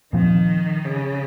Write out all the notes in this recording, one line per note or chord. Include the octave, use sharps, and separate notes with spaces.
A#2 D#3 F3 C4
C#3